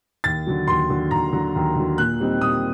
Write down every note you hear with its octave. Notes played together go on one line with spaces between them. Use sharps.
D#2 A6
D3 F#3
D#2 C6
D3 F#3
D#2 A#5
D3 F#3
D#2
D3 F#3
A#2 F#6
G3 C4 D#4
A#2 D#6